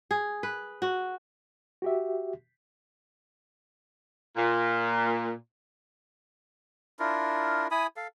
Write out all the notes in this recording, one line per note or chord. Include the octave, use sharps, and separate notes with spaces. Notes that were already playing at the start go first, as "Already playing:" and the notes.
G#4
B4
F#4
F#4 G4 E5
A#2
D4 E4 F4 A#4
E4 G#5 B5 D#6
A4 F5